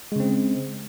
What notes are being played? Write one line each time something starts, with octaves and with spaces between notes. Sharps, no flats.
C#3 G#3 C4